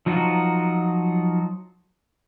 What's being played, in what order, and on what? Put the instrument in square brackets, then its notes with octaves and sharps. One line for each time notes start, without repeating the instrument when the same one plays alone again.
[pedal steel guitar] F3 F#3 D#4 F4 F#4